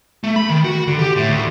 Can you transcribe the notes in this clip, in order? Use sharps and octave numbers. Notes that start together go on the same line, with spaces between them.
A3
B5
D#3
F#4
D3
G4
A2
D2